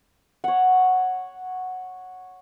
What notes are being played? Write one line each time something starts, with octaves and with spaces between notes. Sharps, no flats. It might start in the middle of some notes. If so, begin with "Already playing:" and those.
C#5 F#5